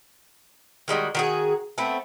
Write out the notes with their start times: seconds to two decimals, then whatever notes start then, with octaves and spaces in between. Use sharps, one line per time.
0.88 D#3 G3 G#3 F#4
1.15 D#3 F#4 G#4
1.78 A3 B3 C4